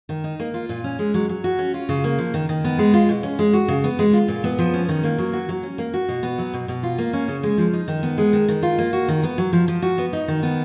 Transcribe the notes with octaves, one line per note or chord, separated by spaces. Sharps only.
D#3
D#4
A#3
F4
A#2
C#4
G#3
F#3
F#3
F#4
C#4
F4
C#3
A#3
F3
D#3
D#3
B3
G#3
F4
B2
C#4
G#3
F#4
C#3
B3
G#3
F4
A#2
B3
F3
C#4
D#3
A#3
F#3
F#4
F#3
C#4
A#3
F#4
B2
B3
F#3
B2
B2
F4
A#3
C#4
C#3
G#3
F3
D#4
D#3
B3
G#3
D#3
D#3
F4
A#3
F#4
D#3
B3
F#3
F3
F3
F#4
B3
D#4
D#3
B3